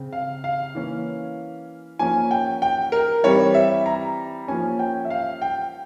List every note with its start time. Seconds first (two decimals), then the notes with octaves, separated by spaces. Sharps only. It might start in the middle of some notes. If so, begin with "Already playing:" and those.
Already playing: C#3 C4
0.13 F5
0.44 F5
0.75 E3 A#3 C#4
1.99 F3 A#3 C#4 G#5
2.31 G5
2.62 G5
2.92 A#4
3.23 E3 G3 C4 C#5
3.54 E5
3.86 A#5
4.48 F3 A#3 C#4 G#5
4.79 G5
5.05 E5
5.10 F5
5.42 G5